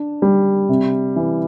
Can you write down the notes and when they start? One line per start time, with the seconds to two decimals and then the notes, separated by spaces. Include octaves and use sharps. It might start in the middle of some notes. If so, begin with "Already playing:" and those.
Already playing: D4
0.22 G3
0.69 C3
1.16 E3